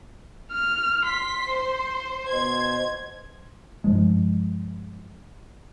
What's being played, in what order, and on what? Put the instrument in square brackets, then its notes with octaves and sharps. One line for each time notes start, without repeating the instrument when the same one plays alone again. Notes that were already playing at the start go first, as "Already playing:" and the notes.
[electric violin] F6
[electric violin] C6 [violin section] B6
[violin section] C5
[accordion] B2 C5 [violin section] G#6
[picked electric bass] G2 F3 G#3